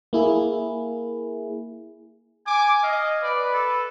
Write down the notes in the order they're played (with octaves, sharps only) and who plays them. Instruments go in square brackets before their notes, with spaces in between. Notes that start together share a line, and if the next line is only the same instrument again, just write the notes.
[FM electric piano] A#3 E4 G#4
[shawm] G#5 [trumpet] D6
[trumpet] D#5 [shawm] F5
[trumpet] B4 [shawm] D5
[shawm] A4